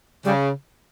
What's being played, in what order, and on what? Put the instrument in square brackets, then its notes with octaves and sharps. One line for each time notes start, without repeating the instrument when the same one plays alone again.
[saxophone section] C#3 [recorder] G3